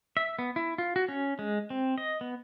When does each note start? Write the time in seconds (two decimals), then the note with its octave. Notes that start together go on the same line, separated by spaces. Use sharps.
0.17 E5
0.39 B3
0.56 E4
0.78 F4
0.96 F#4
1.08 C#4
1.39 G#3
1.70 C4
1.98 D#5
2.21 B3